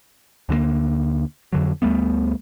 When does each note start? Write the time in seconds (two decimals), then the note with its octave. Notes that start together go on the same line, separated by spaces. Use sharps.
0.49 D2 D3 F#3 A#3
1.53 F2 D3 F#3
1.82 D2 G3 A3 B3